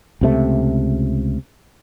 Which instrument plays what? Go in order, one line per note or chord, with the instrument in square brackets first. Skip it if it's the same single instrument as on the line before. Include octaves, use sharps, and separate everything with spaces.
[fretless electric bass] C#2 C3 D#3 A3